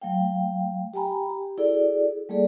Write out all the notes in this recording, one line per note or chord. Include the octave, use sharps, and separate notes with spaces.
F#3 A3 F5 G5
G4 G5 G#5 A#5 B5
G4
E4 F#4 G#4 A4 D5
G3 A3 A#3 G#4 A4 D5